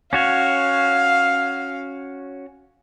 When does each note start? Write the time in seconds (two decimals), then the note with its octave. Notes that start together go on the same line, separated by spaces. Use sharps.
0.13 C#4 F#4 C#5 F5